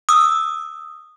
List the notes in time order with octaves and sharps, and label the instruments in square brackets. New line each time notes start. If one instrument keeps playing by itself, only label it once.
[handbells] D#6 E6